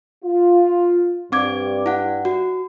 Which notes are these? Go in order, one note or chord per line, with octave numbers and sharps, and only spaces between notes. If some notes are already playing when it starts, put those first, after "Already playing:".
F4
G2 C4 D6 G#6
E4 F#5
F#4